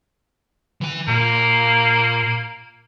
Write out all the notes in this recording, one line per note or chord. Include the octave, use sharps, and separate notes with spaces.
E3 G#5
A#2 A#3